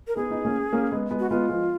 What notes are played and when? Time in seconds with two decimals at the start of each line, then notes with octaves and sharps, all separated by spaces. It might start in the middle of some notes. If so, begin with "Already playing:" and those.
0.08 A#4
0.16 B3 D#4 G#4
0.31 B3 D#4
0.45 A#3 C#4
0.73 A#3 C#4
0.92 G#3 B3
1.11 G#3 B3
1.19 F#4
1.30 G#3 B3 F4
1.49 F3 G#3